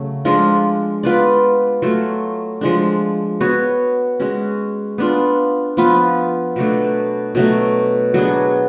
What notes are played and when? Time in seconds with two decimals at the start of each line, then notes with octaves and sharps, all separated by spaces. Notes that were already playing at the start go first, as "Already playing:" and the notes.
Already playing: C#3 F#3 A3
0.25 F3 G#3 D4 F4
1.03 B3 F4 B4 D5
1.82 F#3 A3 F4
2.61 F3 G#3 D4
3.41 B3 F#4 C#5
4.20 G#3 C#4 F#4
4.98 B3 D4 F4
5.77 F3 B3 F4 B4
6.56 B2 F#3 A3 D4
7.35 B2 F#3 A3
8.14 F#3 B3 D4 G#4